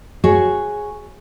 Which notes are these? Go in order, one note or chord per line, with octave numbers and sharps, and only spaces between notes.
F#4 G#4 C#5